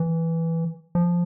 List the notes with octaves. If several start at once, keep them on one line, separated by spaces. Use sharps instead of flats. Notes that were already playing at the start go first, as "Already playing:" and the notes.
Already playing: E3
F3